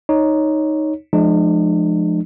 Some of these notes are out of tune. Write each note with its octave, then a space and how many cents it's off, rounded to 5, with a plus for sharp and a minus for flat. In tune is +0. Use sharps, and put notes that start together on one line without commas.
D#4 +0 C#5 +0
F3 +0 G#3 +30 D4 +45